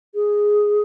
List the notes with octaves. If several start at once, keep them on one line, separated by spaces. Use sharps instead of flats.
G#4